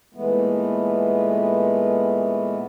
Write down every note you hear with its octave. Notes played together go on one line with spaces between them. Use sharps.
A#2 E3 G#3 A3 B3